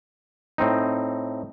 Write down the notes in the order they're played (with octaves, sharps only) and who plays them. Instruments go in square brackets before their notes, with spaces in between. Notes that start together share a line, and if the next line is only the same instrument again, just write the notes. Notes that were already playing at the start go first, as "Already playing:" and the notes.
[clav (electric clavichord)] A2 C4 D#4